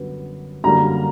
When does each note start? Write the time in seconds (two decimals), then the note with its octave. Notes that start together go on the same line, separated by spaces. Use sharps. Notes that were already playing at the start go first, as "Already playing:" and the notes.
Already playing: F#2 D3 G3 B3
0.64 F#2 D3 G3 A#3 A#5